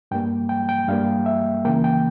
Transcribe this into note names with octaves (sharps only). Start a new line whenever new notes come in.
G2 G3 A#3 G5
G5
G5
G2 G3 A#3 F5
E5
C#2 C#3 E3 A#3 G5
G5